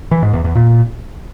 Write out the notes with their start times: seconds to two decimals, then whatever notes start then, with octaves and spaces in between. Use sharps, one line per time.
0.11 E3
0.22 G#2
0.33 E2
0.44 E2
0.55 A#2